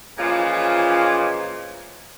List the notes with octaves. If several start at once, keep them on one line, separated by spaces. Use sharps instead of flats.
A#2 E3 F3 G#3 C#4 F4